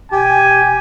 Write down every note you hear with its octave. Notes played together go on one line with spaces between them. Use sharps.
E1 G4 G#5